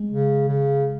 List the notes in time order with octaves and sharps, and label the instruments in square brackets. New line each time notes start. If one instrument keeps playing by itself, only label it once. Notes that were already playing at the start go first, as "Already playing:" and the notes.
Already playing: [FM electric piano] G#3
[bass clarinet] C#3
C#3